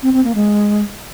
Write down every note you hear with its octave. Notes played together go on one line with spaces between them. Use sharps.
C4
C4
A#3
G#3